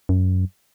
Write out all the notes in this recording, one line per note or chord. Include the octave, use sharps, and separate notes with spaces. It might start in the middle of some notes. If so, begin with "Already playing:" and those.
F#2